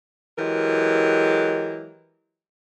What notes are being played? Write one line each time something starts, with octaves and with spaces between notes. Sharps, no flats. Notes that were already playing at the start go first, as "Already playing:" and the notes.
E3 F#3 G#3 G4 A#4